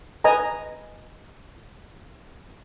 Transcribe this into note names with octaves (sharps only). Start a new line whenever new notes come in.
B4 D#5 G#5 A#5